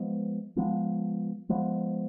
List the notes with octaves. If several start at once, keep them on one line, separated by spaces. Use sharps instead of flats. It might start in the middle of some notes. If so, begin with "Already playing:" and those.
Already playing: F3 G#3 B3
F3 G#3 B3
F3 G#3 B3